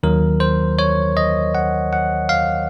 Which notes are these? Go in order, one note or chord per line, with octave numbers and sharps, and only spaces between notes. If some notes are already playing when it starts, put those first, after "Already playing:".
D#2 D#3 F#3 A#4
C5
C#5
D#5
F#5
F#5
F5